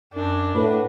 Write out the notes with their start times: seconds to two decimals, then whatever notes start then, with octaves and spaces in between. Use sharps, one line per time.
0.14 F#2 D4
0.55 A2 F#4 B4